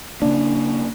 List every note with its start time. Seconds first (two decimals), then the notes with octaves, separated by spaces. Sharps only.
0.22 C#3 A#3 D4